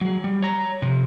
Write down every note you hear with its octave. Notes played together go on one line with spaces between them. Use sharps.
F#3 G#4
G3
C#5 A#5
C3 F3